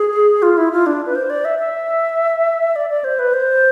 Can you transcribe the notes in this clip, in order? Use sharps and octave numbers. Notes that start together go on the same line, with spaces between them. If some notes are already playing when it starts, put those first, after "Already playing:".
Already playing: G#4
F4
E4
F4
D4
B4
C5
D5
E5
E5
D5
D5
C5
B4
C5